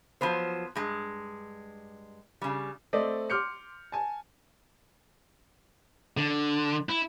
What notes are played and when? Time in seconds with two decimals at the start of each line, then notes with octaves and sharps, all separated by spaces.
0.21 F3 F#3 B3 C5
0.75 G2 G#3
2.41 C#3 G3
2.93 A3 C4 C5 D5 D#5
3.30 C6 D6 F6 G6 C#7
3.92 G#5 A5
6.17 D3
6.89 E4